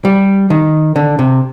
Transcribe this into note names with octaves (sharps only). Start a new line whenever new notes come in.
G3
D#3
D3
C3